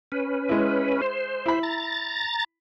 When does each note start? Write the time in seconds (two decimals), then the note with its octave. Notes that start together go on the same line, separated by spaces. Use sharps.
0.12 C#4 B4
0.49 G#3 E4
1.02 C5
1.46 E4 B5
1.63 A#5 A6